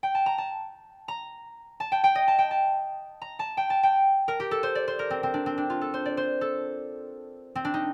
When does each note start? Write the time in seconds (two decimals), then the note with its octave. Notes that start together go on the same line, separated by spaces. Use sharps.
0.03 G5
0.15 A5
0.26 A#5
0.38 A5
1.08 A#5
1.80 A5
1.92 G5
2.04 G5
2.15 D#5
2.28 A5
2.39 G5
2.51 A5
3.22 A#5
3.39 A5
3.57 G5
3.70 A5
3.83 G5
4.28 A#4
4.40 G4
4.51 A4
4.63 C5
4.75 D5
4.88 C5
4.99 A#4
5.10 C4
5.23 C4
5.34 D4
5.46 C4
5.58 D4
5.70 F4
5.81 A4
5.94 C5
6.05 D5
6.17 C5
6.41 A4
7.55 C4
7.65 D4
7.74 D#4